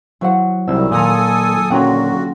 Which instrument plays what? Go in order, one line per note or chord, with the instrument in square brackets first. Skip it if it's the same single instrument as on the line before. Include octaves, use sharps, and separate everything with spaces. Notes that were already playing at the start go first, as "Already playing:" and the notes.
[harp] F#3 [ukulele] E4 C5 F#5
[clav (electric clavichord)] C2 [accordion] D#3 F#3 G3 [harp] E6
[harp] D#1 A#5 [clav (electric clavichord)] A#2 [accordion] A4 G#5 D#6
[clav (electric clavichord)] A#2 F#3 [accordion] D3 F#4 [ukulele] C#4 G5 [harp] F4 F#5